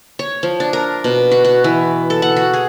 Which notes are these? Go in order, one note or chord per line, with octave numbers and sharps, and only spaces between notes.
C#5
F3
D4
A#4
B2
F#4
F#4
E3
A4
F#5
F#4
G#4